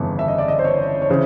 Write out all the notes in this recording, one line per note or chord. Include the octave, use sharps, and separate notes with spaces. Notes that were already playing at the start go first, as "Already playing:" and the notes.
Already playing: G1 F2 C#3 E3
E5
D#5
D5
D#5
C5
C#5
C#5
C#3 E3 C5